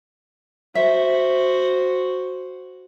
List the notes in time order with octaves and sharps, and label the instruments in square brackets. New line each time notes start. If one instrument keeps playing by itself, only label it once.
[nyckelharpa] F#4 C5 [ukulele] E5